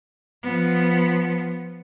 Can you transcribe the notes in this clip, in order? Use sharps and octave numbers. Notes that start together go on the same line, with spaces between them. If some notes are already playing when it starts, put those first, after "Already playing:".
F3 B3